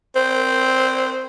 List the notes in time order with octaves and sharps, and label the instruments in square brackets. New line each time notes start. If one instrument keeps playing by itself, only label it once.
[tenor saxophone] C4